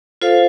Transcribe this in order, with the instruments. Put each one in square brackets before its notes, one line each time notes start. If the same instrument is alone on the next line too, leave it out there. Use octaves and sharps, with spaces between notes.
[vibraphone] F4 A4 C5 F5